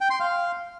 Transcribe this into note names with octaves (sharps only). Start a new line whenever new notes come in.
G5
C6
F5